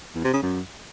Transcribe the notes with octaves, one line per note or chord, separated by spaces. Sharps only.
E2
C3
C#3
F#2